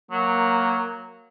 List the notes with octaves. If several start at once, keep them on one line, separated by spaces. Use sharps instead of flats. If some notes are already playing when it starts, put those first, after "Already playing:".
F#3 A#3